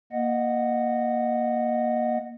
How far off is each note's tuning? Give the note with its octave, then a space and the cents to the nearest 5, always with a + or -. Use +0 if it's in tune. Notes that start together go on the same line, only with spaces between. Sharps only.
A#3 +15 D#5 -15 F#5 -5